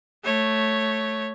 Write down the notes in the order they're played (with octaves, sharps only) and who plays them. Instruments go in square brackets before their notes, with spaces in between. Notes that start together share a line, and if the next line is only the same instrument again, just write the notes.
[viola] A3 C#5